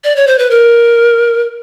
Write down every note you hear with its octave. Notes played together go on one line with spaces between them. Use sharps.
D5
C#5
C5
B4
A#4